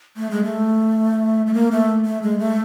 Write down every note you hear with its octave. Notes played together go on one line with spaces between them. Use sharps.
A3
G#3
A3
A3
A#3
A3
A3
G#3
A3